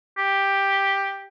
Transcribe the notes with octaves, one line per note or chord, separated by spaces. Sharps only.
G4